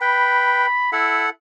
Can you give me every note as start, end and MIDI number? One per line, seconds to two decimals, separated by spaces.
0.01 0.66 71
0.01 0.66 79
0.01 0.92 83
0.93 1.25 64
0.93 1.30 69
0.93 1.30 78